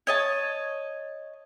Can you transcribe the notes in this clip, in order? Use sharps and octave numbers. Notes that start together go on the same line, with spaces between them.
C#5 D#5 A5